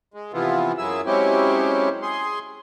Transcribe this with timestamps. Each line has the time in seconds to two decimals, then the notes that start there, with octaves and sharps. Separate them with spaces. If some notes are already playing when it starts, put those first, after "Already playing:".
0.14 G#3
0.33 C3 E3 F3 B3 E4 F4
0.78 F#2 F#3 E4 G#4 E6
1.06 F#3 G#3 C4 C#4 E4 G4
2.02 G#4 C6